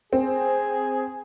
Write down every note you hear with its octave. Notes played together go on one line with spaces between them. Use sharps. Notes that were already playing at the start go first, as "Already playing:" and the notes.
C4 G#4